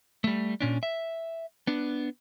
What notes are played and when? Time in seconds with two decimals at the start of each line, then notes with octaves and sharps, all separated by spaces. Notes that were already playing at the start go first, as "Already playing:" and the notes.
0.24 G3 A3
0.61 A#2 C#4 D4
0.83 E5
1.67 B3 D4